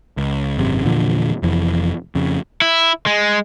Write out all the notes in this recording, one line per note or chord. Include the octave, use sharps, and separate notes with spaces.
C#2
G#1 F#2 C3
E2 A#2 D3 F3
F1 F2 E3
F2 C#3
E4
G#3